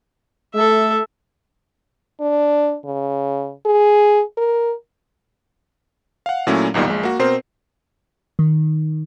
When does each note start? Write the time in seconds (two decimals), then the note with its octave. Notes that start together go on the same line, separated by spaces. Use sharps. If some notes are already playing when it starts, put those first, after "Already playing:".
0.54 A3 A4 E5
2.21 D4
2.85 C#3
3.66 G#4
4.38 A#4
6.26 F5 F#5
6.47 A#2 F#3 A3 C#4 E4
6.74 B1 E2 A#2 D#3 G3
6.87 A#1 G#3
7.03 A#3 F#4
7.19 B2 C4 A#4 C5 C7
8.39 D#3